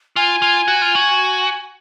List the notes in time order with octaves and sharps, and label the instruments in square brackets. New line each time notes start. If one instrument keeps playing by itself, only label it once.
[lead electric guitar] F4 [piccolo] G#5
[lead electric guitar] F4
F#4
F4
F#4